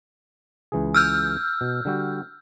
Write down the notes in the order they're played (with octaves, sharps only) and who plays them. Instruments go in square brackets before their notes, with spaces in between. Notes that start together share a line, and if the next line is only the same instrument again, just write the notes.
[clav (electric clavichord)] C#2 E3 G#4
[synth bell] E6 F6 G6
[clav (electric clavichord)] B2
D3 G3 F#4